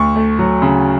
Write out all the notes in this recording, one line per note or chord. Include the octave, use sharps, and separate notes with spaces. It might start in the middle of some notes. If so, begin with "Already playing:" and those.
Already playing: D2 C#6
A3
F#3
C#3